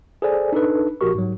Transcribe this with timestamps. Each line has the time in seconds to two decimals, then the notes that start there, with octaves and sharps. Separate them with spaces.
0.22 G#4 A4 C5 D5 G#5
0.52 D4 D#4 A4 B4
1.01 A#1 F#4 G4 A#4 C#6
1.15 G#2 F#3